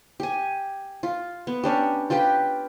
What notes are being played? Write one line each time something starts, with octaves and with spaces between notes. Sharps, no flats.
G4 G#5
F4
B3
C#4 D4 G4
F4 G4 B4 G5